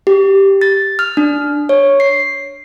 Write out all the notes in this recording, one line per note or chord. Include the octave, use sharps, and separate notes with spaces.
G4
A6
F6
D4
C#5
C7